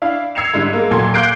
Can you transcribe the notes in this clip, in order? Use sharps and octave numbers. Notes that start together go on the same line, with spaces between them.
D4 E4 F5
E6 G#6 C7 C#7 E7 F7
G#2 D3 G3 E4
G#3 A#3
D#2 A#2 F#3 A4 C6 G#6
F5 D6 F#6 G6 C7 D7